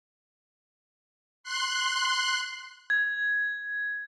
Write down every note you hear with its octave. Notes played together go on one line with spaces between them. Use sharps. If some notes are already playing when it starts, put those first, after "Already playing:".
C6 F#6
G#6